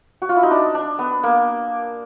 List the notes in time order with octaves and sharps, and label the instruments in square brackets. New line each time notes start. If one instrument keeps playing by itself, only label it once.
[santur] F#4
F4
E4
D#4
D4
D4
B3
A#3